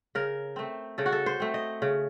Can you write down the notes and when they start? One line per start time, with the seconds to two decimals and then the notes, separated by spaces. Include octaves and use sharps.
0.15 C#3 A#4
0.56 A3 C4
0.98 C#3 A4
1.06 F#4
1.12 A4
1.26 C5
1.40 A3 C4
1.54 D#5
1.82 C#3